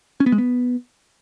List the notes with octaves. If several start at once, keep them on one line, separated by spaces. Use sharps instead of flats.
C#4
B3
G#3
B3